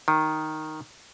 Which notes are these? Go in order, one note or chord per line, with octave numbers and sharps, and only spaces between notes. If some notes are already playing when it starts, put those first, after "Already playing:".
D#3